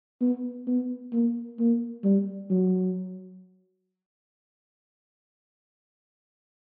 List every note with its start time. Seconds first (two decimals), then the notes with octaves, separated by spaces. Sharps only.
0.21 B3
0.67 B3
1.13 A#3
1.59 A#3
2.04 G3
2.50 F#3